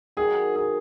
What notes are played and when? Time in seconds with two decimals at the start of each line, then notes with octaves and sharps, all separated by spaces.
0.17 D#3 F#3 G#4
0.55 G#4